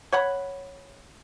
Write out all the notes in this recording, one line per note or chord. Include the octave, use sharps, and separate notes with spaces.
C#5 F#5 B5